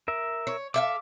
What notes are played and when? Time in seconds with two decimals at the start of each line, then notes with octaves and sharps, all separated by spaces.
0.08 A#4 E5
0.47 C#5
0.74 A4 E5 F5 D6